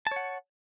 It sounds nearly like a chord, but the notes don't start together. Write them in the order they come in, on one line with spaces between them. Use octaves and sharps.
A5 C#5 F#5